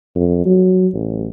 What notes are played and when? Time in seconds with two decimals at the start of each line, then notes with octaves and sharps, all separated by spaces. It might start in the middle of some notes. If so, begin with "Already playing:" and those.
0.16 F2
0.45 F#3
0.94 A1